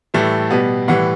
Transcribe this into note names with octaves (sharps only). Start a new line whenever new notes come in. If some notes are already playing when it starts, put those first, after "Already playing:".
A2 E3 G3 A3
B2 G3 B3
A2 E3 G3 F#5